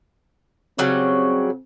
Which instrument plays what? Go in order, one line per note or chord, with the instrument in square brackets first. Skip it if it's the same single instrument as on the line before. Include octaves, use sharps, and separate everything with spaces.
[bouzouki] C#3 F#3 G3 [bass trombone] C4